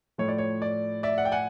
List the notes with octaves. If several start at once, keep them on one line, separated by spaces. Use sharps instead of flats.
A2 F3 A3 C#5
D5
C#5
D5
D5 E5
F#5
G5
F#5 G#5